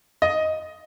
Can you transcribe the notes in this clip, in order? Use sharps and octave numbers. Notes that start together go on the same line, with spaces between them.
D#5